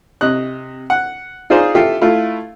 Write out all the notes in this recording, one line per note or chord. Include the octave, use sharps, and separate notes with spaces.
C3 D#5 F#6
F#5
D#4 F4 G#4 C5 D5
F4 G4 A4 E5 F5 G5
A3 E4 F4